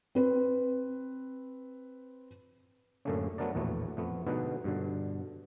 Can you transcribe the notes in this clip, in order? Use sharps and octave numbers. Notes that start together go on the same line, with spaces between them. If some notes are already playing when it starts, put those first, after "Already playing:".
C4 B4
F#2 A2 D3 A3 A#3 C#4
F#3 A3 B3 D4 A#4 D5
A#1 E2 A2 A3 B3 F#4
F2 A3 B3
G#2 B2 D3 B3 D#4 B4
G2 B2 D3